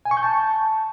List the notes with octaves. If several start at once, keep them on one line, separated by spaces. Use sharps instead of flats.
G#5
C#6
G6
A5